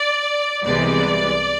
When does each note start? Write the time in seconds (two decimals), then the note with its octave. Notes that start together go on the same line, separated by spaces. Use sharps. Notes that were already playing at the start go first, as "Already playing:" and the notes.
Already playing: D5
0.65 C2 C3 E3 G#3 B3 D5